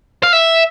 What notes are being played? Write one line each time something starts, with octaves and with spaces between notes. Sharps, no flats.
F5
E5